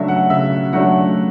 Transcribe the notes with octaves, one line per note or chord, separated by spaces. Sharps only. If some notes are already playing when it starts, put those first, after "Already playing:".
Already playing: C#3 F#3 A3 D4 E5
F#5
C#3 E5
F#3 A3 D4 F#5